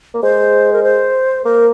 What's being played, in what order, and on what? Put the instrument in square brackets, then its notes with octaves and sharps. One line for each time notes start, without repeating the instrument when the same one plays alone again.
[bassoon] A#3
[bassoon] G#3 [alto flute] C5
[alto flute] A#4
C5
[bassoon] A#3 [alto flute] A#4